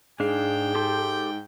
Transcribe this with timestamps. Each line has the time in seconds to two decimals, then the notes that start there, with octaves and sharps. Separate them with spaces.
0.20 G#2 D4 G#4 F5 G5
0.75 G4 A4 C6